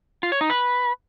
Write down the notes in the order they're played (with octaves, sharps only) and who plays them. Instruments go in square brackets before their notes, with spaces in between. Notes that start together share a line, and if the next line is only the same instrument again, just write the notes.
[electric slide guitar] F4
C#5
D#4
B4